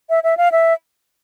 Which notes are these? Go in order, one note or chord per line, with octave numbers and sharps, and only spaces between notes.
E5
E5
F5
E5